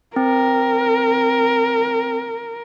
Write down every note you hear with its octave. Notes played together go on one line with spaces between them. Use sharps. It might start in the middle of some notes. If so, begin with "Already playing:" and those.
C4 A#4